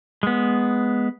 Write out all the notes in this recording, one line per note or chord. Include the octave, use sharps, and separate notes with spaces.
G#3 B3